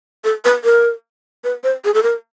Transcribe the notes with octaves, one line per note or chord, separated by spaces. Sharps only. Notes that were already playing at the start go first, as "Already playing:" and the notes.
A4
B4
A#4
B4
C5
G#4
A4
A#4